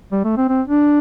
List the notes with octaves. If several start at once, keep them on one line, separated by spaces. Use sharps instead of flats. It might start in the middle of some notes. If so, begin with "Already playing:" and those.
G3
A3
C4
C4
D4